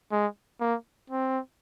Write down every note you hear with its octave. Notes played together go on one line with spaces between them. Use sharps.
G#3
A#3
C4